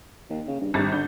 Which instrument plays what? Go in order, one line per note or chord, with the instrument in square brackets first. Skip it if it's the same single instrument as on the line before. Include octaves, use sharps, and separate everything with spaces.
[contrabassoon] D#2
C#3
G2
[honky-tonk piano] G#1 G3 A6 [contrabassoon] G2
[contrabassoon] D3 [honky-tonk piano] G6